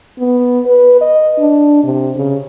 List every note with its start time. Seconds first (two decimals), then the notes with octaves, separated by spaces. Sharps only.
0.18 B3
0.66 B4
1.01 D#5
1.39 D4
1.84 C3
2.16 C#3